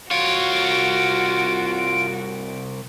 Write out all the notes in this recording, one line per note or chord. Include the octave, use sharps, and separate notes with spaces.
C2 F4 F#4 C#5 D7